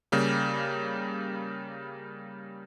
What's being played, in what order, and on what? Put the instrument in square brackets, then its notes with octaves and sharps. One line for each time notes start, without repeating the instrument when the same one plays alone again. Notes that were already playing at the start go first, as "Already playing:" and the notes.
[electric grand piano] C#3 G3 A#3